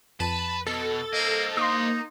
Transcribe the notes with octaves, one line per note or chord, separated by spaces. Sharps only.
F2 B4 A5
B2 A4
A#3 C5 D#5
A#3 D#4 C6 D#6